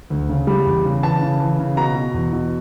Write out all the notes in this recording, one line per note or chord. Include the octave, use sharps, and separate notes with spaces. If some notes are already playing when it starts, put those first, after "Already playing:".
D2
C#3
G3
E2
C#3
E3 A5
C#3
E3
C#3
B2 A#5
B2
E2
B2